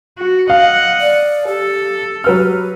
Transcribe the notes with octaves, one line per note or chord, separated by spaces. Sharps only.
F#4
D#5 F5 F#5
D5
G4 A4
F#3 G4 B4 F6